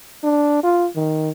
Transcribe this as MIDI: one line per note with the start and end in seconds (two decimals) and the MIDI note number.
0.24 0.63 62
0.63 0.88 65
0.96 1.30 51